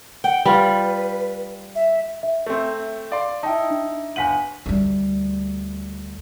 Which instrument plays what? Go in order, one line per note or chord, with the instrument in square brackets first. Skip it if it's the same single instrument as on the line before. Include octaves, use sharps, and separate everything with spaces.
[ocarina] F#5 [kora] G5
[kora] G3 F4 [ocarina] B4
[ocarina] E5
[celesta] E5
[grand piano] A3 C4
[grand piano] D5 C6 [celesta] F5
[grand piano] D#4 E4 [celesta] G5 A5
[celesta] D4
[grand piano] G1 F#5 F#7 [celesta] G#5 B6 D#7
[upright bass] D2 G3